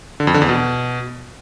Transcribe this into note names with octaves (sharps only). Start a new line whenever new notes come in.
D3
F2
D3
E2
B2